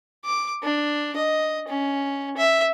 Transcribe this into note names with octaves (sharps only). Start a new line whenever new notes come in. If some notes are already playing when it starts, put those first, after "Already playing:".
D6
D4
D#5
C#4
E5